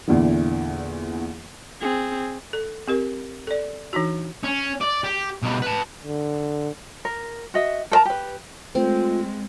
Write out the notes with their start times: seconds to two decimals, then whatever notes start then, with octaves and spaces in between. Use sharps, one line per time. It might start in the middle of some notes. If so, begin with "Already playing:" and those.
0.08 E2 A#2 D3 E3
1.81 C4 G#4
2.53 A4
2.87 C4 G4 A#4
3.47 A4 D5
3.93 E3 D4 D#4 F#4
4.43 C#4
4.81 D5
5.04 G4
5.42 B2 G3
5.62 B4 A5
6.03 D3
7.05 A#4
7.54 F#4 D#5 E5
7.92 A4 A#4 A5 A#5
8.05 G4 B4
8.75 G#3 A3 C4 F4